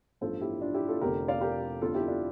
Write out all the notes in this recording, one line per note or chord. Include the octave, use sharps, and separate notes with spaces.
A1 G2 F3 A4 C5
E4 G4
D4 F4
E4 G4
F4 A4
F1 F2 D3 F3 G4 A#4
D5 F5
G4 A#4
G1 F2 D3 F4 A4
E4 G4
D4 F4